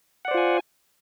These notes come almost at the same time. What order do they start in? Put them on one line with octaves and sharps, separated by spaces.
F#5 D5 C5 F4 G#5